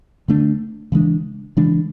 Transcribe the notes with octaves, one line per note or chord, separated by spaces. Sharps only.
D3 A3 D4
C#3 E3 G#3 D4
C#3 E3 G#3 D4